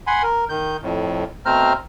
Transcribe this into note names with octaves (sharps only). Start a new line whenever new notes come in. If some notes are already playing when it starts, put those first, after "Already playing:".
F#5 G#5 B5 C6
A#4
D#3 G6
F2 A2
B2 A3 C4 C5 A#5 F6